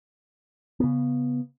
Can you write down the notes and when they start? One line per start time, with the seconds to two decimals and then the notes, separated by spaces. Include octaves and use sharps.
0.80 C#3 B3